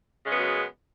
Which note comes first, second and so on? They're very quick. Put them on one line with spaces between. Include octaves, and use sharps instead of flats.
C#3 G#3 B3 F#2 F#3